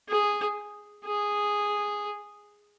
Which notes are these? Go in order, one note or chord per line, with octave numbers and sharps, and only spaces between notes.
G#4
G#4